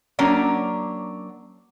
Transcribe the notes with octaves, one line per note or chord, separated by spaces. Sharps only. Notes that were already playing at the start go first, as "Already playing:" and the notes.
F#3 A#3 C#4 D4